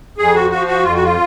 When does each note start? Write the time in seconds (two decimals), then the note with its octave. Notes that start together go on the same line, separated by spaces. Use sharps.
0.18 F2 G#4
0.34 F#4
0.50 F3 F#4
0.67 F#4
0.83 F2 F4
0.94 F#4
1.03 F4